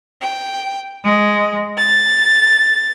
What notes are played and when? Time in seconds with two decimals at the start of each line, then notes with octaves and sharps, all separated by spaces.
0.21 G5
1.03 G#3
1.77 A6